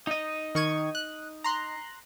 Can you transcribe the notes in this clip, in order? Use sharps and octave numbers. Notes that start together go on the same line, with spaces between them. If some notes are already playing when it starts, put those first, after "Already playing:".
D#4 D#5
D#3 C#6 G#6
F#6
A#5 C6 F#6